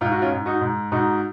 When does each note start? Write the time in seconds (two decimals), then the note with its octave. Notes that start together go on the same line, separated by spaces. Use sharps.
0.01 G#2 F4
0.12 F#4
0.22 C#4 F4
0.32 G#2
0.46 D#4 F#4
0.61 G#2
0.92 G#2 D#4 F#4